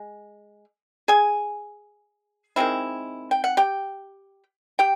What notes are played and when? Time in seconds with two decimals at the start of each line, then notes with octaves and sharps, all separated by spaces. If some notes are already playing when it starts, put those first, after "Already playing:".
Already playing: G#3
1.08 G#4 G#5
2.56 D#3 G#3 C4 E4
3.31 G5
3.44 F#5
3.57 G4 G5
4.79 G4 G5